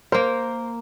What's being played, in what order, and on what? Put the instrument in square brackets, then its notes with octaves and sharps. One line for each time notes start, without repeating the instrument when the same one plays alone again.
[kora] A#3 A#4 [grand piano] C5